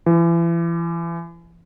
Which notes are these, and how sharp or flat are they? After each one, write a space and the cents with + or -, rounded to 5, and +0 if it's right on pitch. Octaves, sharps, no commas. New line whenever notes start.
E3 +35